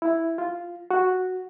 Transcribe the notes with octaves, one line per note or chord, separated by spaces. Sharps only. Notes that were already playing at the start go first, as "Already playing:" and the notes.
E4
F4
F#4